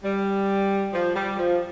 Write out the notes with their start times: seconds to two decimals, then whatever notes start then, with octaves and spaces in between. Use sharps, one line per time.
0.03 G3
0.93 F3
1.15 G3
1.38 F3